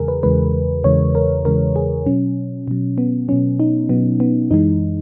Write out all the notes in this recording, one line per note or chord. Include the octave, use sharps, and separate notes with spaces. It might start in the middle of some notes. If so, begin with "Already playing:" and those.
Already playing: E2 C#3 E3 G#3 G#4 A#4
B4
E2 C#3 E3 G#3 B4
E2 C#3 E3 G#3 C#5
A#4
E2 C#3 E3 G#3 A#4
G#4
B2 F#3 C#4
B2 F#3
B3
B2 F#3 C#4
D#4
B2 F#3 B3
B3
F#2 E3 G#3 D#4